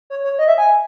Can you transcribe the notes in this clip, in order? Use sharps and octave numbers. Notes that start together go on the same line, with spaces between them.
C#5
C#5
D#5
E5
G#5